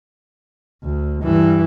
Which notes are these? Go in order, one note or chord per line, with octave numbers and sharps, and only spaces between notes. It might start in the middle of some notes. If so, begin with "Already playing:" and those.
D2
G2 E3